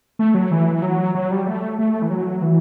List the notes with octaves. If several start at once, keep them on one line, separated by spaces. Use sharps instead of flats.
A3
F#3
E3
F#3
F#3
G3
A3
A3
E3
F#3
E3